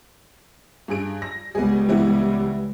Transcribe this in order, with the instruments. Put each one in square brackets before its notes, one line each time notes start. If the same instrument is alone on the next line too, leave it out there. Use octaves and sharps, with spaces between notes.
[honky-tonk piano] G2 G#4 D7
A#6
[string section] C#2 G3 [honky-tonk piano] B3 G#4
[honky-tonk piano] E3 B3 E4